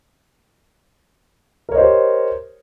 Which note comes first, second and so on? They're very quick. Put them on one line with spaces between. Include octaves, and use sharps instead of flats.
A#4 C#5 D#5 C5 G4